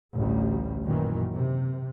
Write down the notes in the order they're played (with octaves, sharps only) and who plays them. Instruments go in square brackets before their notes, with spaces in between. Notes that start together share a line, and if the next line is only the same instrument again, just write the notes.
[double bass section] A1 D2 G3
F#2 A#2 D#3 E3
C3